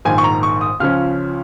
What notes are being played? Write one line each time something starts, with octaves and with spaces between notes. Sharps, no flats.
A#1 G#2 D#3 G#5
C#6
A#5
C#6
D#6
C#2 C#3 F3 C#4 F6